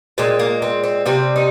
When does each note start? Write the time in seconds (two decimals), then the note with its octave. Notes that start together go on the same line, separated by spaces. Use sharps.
0.18 A#2 G#3 C4
0.39 A#3
0.62 C4
0.84 C4
1.06 C3 G3 C4
1.36 D#4